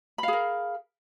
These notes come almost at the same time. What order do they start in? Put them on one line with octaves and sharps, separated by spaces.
B5 F5 G#4 A#4